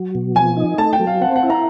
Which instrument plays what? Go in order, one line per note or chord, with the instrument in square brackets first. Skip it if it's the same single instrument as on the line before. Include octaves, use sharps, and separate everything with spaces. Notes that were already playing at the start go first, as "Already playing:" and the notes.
Already playing: [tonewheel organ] F#3
B2
[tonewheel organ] F3 [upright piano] G#5
[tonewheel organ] D#4
[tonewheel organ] A3 [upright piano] A5
[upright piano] G5
[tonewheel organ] F#3
[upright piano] F5
[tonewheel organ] C4 [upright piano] F#5
[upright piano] F#5
[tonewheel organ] E4
[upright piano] A#5